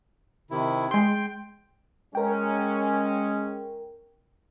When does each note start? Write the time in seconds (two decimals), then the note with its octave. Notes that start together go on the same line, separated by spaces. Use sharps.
0.51 C3 D#3 E4
0.91 G#3 G5 C6
2.15 G#3 C#4 A#4 G5